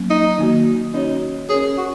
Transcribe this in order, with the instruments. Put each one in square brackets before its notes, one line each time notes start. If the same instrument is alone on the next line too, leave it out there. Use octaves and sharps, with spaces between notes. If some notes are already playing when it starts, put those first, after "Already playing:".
Already playing: [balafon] F#3 A#3 C#4
[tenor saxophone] D#4
[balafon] D#3 A#3 F#4
[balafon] C#4 F#4 C#5 [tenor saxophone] D#4
[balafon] C#4 A#4 C#5 [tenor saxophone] G#4
[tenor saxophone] F#4